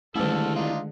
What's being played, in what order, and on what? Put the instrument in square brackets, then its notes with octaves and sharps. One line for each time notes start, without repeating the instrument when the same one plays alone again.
[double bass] D3 G#3 [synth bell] D#3 A3 [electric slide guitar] E4 G4 [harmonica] A4 F6
[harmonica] D4 D#4 F4